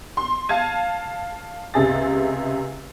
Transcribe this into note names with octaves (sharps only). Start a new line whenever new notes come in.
C6
F5 A5 G#6 D#7
C#2 C3 G#4 A6